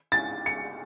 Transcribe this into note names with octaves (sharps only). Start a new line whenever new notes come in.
A6
C#7